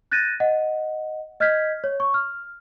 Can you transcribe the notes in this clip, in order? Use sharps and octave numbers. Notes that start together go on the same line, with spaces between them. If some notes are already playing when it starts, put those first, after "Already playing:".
F#6 G6 A6 A#6 D#7
D#5 F#5
D#5 F6 G6 G#6 B6
C#5
C#6
F6